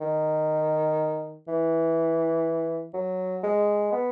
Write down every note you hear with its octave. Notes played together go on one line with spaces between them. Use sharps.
D#3
E3
F#3
G#3
B3